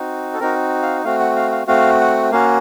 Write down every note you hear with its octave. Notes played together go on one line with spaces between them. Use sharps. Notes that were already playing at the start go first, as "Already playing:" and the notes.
Already playing: C4 D#4 F#4
A4
C4 D#4 F#4 A#4
F5
A3 C4 F#4 F5
F#5
F5
F5
A3 C4 F#4 F5
F#5
A#3 C#4 F#4 F5